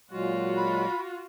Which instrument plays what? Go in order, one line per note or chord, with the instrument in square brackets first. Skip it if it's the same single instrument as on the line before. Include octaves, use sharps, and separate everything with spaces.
[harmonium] A#2 F#3 G#3 [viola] F4 F#4
[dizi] B5